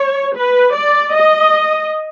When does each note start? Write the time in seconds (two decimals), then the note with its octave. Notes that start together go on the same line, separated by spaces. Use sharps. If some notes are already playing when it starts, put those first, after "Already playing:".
Already playing: C#5
0.35 B4
0.74 D5
1.13 D#5